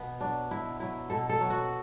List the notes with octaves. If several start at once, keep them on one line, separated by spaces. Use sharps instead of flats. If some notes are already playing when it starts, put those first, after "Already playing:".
Already playing: B2 B3
F#3 D4
B2 E4
F#3 E4
B2 A4
A4
F#3
F#4